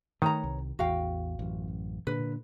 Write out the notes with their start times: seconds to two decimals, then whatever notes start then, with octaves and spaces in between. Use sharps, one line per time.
0.22 D#3 A3 B4 C#5 A#5
0.44 C2
0.79 A1 E2 F#4 F5 G5
1.39 A1 F#2
2.07 A#2 D3 B4